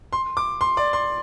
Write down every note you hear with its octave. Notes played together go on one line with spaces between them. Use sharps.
C6
D6
C6
D5
C6